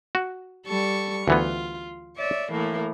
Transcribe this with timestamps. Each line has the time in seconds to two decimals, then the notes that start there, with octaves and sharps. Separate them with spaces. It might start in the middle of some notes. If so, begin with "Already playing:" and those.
0.15 F#4
0.66 G3 A4 C#6
1.28 D2 E3 B3 F4
2.15 C#5 D5 E5
2.51 A2 E3 A#3